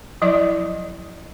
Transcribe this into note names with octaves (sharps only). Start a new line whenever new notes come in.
F3 F#3 E4 D5 D#5